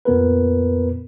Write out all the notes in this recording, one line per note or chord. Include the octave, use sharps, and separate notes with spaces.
F2 A#2 B3 A#4 B4